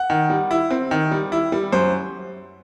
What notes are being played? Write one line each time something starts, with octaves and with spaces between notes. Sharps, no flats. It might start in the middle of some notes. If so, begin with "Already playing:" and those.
Already playing: F#5
D#3
G3
E4
C4
D#3
G3
E4
G3
F#2 C5